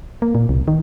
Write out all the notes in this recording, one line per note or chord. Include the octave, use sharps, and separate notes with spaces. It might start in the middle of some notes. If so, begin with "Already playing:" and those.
A#3
A#2
C2
D#3